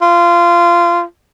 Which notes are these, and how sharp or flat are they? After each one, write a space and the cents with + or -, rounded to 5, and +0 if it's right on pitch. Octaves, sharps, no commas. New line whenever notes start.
F4 -20